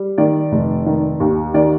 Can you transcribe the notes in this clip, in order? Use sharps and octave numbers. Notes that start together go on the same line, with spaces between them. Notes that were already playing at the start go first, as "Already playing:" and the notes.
Already playing: G3
D#3 D5
F1
D#3
D#2
D#3 D5